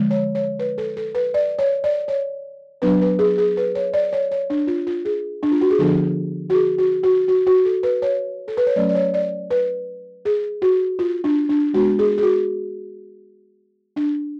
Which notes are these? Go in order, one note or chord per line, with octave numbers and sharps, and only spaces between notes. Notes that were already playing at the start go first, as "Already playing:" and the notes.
Already playing: D3 F3 G#3
C#5
C#5
B4
A4
A4
B4
D5
C#5
D5
C#5
F#3 B3 D4 B4
B4
G#4
G#4
B4
C#5
D5
C#5
C#5
D4
F4
F4
G#4
D4
F4
F#4
G#4
D3 F3 B3 D4 A4
F#4
G#4
F#4
F#4
F#4
F#4
A4
B4
C#5
A4
B4
C#5
F#3 A3 C#4 D5
D5
C#5
D5
B4
G#4
F#4
F4
D4
D4
G#3 B3 D4 F#4
G#4
G#4
F#4
D4